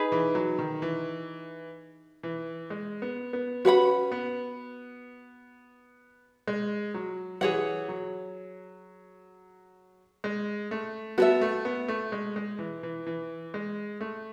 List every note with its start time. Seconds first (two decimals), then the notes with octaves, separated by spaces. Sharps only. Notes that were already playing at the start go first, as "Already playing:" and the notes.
Already playing: D#4 G#4 B4
0.12 E3
0.35 F#3
0.59 D#3
0.82 E3
2.23 E3
2.70 G#3
3.02 B3
3.33 B3
3.65 C#4 F#4 B4 F#5 B5
4.12 B3
6.48 G#3
6.94 F#3
7.41 E3 G#4 C#5 F#5
7.88 F#3
10.24 G#3
10.71 A3
11.18 B3 F#4 A4 E5
11.41 A3
11.65 B3
11.88 A3
12.12 G#3
12.36 G#3
12.59 E3
12.83 E3
13.07 E3
13.54 G#3
14.01 A3